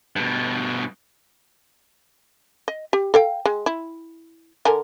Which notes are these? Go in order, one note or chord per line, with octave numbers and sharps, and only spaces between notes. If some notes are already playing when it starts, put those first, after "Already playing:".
G2 B2
D#5
G4
A4 F5 G5
G#3
E4
D3 A#4 G#5